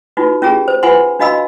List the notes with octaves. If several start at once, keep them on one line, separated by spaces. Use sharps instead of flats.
D#4 F4 F#4 B4
C#4 F4 G4 G#4 A#5
C5
F4 B4 F#5 G#5 C6
D4 F#4 D#5 F5 B5 E6